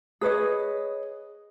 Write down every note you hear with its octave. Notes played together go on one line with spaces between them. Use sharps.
G#4 B4 C#5 D#5